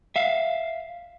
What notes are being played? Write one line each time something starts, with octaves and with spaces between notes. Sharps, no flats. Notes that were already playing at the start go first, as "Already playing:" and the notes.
E5 F5